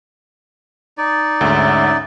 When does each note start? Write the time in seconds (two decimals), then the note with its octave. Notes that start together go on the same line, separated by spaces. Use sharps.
0.98 D#4 D5
1.41 D2 G#2 C#4 E5 F#5